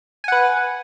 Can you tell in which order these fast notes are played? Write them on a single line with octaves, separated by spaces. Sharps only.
G#5 F#5 B4